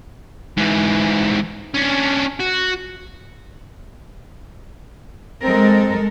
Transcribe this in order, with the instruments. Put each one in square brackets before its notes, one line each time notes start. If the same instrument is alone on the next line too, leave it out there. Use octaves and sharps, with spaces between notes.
[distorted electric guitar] G#2 E3
C#4 D4
F#4
[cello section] G#3 A4 A#4 [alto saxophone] C4